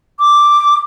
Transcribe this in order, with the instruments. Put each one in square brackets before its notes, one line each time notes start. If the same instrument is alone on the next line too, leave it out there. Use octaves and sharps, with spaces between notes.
[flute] D6